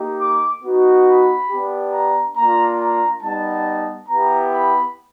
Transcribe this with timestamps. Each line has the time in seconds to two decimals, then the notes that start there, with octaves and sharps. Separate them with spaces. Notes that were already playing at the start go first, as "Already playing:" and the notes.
Already playing: A#3 D#4 G4
0.20 D6
0.63 B3 D#4 F#4
1.07 B5
1.50 B3 D4 G4
1.93 A#5
2.36 A#3 D4 F4 A#5
2.79 A#5
3.22 G3 B3 D#4 A5
4.09 B3 E4 G4 A#5
4.52 B5